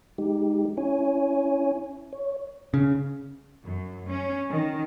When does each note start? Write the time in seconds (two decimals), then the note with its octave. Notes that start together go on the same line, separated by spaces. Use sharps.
0.18 G#3 D#4 G4
0.77 C#4 E4 C#5 G#5
2.13 C#5
2.74 C#3
3.64 F#2
4.09 C#4
4.49 D#3